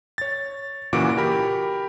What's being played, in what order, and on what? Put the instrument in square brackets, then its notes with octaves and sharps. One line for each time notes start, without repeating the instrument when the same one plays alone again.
[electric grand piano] C#5 A6
A#2 C#3 E3 F#4 D6 D7
G4 A#4 B5